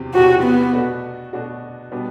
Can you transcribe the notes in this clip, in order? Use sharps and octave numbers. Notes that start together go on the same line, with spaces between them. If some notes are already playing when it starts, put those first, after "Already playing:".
Already playing: E2 C3 F#3 C4
E2 C3 F#3 C4 F#4 G4
B3
B2 A3 D4 F#4
B2 A3 D4 F#4
B2 G3 B3 D4